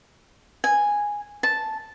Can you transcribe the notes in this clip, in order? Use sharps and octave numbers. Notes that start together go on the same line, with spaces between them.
G#5
A5